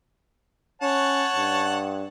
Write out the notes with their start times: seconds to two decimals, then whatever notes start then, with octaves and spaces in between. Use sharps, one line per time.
0.82 C#4 C#5 F#5 A5
1.36 G2